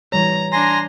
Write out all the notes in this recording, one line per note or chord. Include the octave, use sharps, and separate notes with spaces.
E3 G3 C#5 A#5
D4 G#5 A#5 C6 A#6